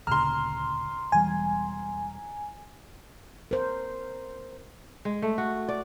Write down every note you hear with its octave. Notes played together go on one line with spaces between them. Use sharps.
D2 A#2 C#3 A#5 C6 F6
E1 E3 G3 G#5
A#4 C5
G#3
A3
F#4
D5